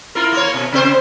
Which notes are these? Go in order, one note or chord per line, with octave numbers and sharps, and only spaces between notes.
E4 F4 A#4
A#3 C#5
B2
C#3 C4 C5